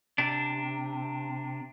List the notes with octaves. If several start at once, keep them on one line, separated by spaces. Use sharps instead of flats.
C3 D4